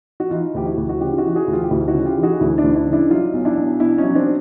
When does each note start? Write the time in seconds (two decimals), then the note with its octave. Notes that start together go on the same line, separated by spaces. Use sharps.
0.20 F#4
0.31 E3 D#4 F4
0.54 D2 G4
0.66 E4 F#4
0.77 D2
0.89 F#4
1.01 C#3 F4 G4
1.13 F4
1.18 E4 F#4
1.24 E3
1.36 F#4 G#4
1.48 D2
1.53 F4 G4
1.63 G4
1.70 D2 E4 F#4
1.88 E4 F#4
1.94 C#3
2.05 F4 G4
2.17 E3
2.23 F#4 G#4
2.40 D2 D4 E4
2.58 D4 E4
2.64 D2
2.76 D4 E4
2.87 C#3 D#4
2.93 D4 E4
3.10 F#3 D#4 F4
3.33 B1
3.45 D4 E4
3.57 B1
3.80 B2 D4 E4
3.98 C#4 D#4
4.03 F#3
4.15 C4 D4